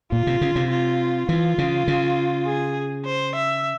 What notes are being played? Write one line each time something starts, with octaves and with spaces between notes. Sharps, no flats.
A#2 F4
C3
C#3
C3
F4
E3 F4
C#3
C#3
G#4
C5
E5